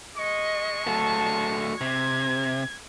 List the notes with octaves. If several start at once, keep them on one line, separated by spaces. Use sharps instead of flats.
G#3 D#5 C#6
F#3 A3 A5
C3 G#6